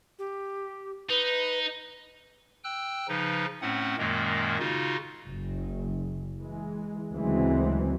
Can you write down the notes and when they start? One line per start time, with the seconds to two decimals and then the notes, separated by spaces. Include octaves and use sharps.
0.19 G4
1.10 D#4 B4
2.64 G5 E6 F#6
3.08 C#3 F3 D#4 B4
3.62 A2 A3 C4 C#4 F#5
3.98 F#2 A#2 D#3 G#3 A#3
4.59 C#3 D#4 F4 F#4
5.26 F#1
6.39 E3 G#3
7.14 D2 C#3 E3 F#3 G#3 C4